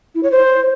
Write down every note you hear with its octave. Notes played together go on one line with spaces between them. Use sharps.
E4
C#5
C5